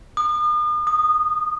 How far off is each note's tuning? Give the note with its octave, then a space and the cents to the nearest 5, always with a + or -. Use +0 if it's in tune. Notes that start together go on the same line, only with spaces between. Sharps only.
D#6 -40
D#6 -15